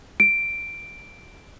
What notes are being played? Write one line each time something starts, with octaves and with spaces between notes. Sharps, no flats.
D7